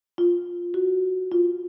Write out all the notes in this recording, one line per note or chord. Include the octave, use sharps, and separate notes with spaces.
F4
F#4
F4